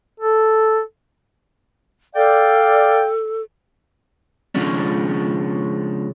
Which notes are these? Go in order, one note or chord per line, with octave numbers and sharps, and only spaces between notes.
A4
A4 D5 F5 G5
C#3 F3 G#3 C#4 D4